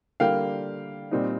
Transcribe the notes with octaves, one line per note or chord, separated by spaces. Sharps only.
D3 G3 A#3 F5 G5
A#2 G3 C4 D#4